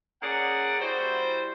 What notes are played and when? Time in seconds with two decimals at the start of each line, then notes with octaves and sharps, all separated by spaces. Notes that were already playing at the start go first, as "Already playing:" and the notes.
0.22 A#3 C#4 G#4 D5 F#5
0.80 G3 E4 F#4 C5